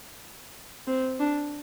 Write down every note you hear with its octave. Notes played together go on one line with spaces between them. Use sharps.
C4
D4